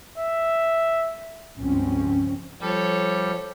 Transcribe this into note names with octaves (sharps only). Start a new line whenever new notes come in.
E5
C#2 G2 F3 C4 C#4
F3 G3 A4 C#5